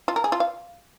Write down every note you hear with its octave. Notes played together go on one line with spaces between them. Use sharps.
F4
A#4
G#4
F4
F5